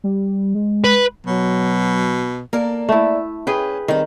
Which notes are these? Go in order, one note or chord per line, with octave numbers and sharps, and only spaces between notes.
G3
G#3
B4
B2 F#3
A#3 A4 A#4 D5
A3 E4
C#4 G#4 B4 G5
D#3 G3 C4